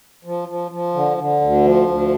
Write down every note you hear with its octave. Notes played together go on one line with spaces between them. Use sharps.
F3
F3
F3
D3
D3
D2
F3
D2